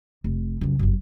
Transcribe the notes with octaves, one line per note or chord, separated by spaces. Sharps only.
F1
C#2 F#2
G1 F#2